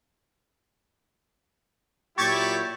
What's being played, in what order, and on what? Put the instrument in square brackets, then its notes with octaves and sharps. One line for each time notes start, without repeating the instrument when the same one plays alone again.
[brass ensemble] A#2 F#3 E4 [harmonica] G4 [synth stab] C#6 G#6 A6